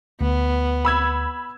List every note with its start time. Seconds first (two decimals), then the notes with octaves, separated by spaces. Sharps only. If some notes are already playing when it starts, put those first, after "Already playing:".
0.21 D2 B3
0.85 B5 E6 G#6